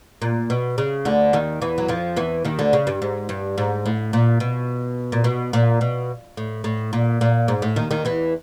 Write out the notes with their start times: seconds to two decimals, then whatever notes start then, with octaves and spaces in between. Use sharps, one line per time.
0.22 A#2
0.50 B2
0.78 C#3
1.05 D2 D3
1.33 D#2 D#3
1.61 E2 E3
1.78 F#3
1.88 F2 F3
2.16 E2 E3
2.45 D#2 D#3
2.59 D2 D3
2.73 C#3
2.87 G2
3.02 G#2
3.29 G2
3.58 G#2
3.86 A2
4.13 A#2
4.40 B2
5.12 A#2
5.24 B2
5.53 A#2
5.81 B2
6.37 A2
6.64 A2
6.93 A#2
7.21 A#2
7.48 G#2
7.62 A2
7.76 D#2 D#3
7.91 D#2 D#3
8.05 E2 E3